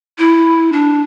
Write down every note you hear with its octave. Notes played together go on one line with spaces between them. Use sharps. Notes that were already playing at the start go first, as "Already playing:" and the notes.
E4
D4